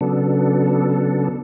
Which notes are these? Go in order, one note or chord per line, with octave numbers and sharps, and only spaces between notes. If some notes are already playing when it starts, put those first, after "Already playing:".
C#3 F#3 B3 D4 A4